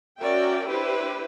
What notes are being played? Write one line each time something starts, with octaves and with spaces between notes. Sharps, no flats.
C#4 F#4 A#4 D5 E5 G5
D4 E4 G4 B4 C5